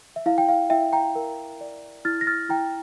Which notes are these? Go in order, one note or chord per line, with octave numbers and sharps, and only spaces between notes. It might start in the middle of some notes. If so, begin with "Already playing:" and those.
E5
E4 F5
G5
F5
E4 E5 G5
G5 A#5
A#4
D5
E4 F6 A6
A#6
F6 A6
E4 G5 A#5